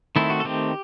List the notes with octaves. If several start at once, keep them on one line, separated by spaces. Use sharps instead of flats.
D#3 A3 C4 E4
F#4
A4
D#3 A3 C4 G4